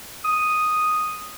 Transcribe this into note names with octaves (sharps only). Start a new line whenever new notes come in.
D#6